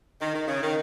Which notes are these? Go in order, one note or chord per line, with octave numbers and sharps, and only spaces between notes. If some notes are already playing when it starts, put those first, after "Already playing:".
D#3
D#3
C#3
D#3